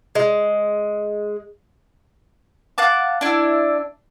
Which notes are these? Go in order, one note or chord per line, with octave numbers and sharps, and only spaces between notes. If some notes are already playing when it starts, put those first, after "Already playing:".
G#3
F5 F#5 A5 D6
D4 E4